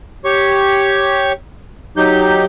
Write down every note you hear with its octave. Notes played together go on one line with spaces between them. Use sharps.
G4 C#5 C#6
F#3 D#4 G4 G6